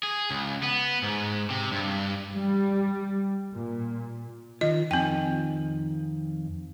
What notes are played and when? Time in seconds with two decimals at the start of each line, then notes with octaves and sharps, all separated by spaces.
0.03 G#4
0.31 C#2
0.63 B3
1.03 G#2
1.50 C3
1.72 G2
2.32 G3
3.53 A#2
4.61 D#3 F4 D#5
4.91 F2 D#3 C4 G5